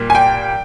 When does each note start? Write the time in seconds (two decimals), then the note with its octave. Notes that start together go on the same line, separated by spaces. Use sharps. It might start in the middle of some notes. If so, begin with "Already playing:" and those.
Already playing: A#2 G3 A#3
0.10 G#5
0.15 G5